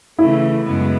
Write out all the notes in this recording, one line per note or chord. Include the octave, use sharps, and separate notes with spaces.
C#3 E3 A3 E4
F#2 C#3 G#3 B3